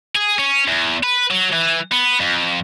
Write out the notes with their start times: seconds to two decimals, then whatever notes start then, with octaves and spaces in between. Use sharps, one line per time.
0.15 G#4
0.39 C#4
0.68 E2
1.03 B4
1.31 F#3
1.53 E3
1.92 B3
2.20 F2